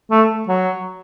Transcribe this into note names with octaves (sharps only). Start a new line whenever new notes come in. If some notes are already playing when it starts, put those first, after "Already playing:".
A3
F#3